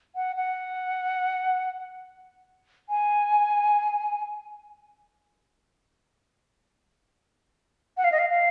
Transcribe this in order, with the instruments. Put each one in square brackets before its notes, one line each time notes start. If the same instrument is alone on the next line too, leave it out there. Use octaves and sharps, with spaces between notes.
[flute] F#5
F#5
G#5
F#5
F5
D#5
F5
F5